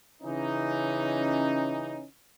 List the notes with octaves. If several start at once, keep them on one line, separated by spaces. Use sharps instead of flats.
C#3 E3 C#4 D#4